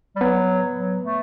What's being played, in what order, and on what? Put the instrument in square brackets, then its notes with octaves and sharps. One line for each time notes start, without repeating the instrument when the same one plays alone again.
[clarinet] G3
[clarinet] F#3 [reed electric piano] B3 B4
[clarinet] F#3
A3